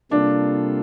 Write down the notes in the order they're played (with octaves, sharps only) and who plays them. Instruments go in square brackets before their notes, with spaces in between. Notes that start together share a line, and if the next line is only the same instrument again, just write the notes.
[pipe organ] C3 G3 A#3 F4 A4 [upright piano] D4